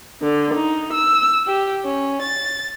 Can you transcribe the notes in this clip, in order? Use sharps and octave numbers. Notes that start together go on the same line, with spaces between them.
D3
D#4
E6
G4
C#4
A6